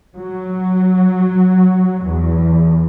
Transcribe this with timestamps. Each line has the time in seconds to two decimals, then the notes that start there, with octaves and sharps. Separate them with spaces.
0.17 F#3
2.05 E2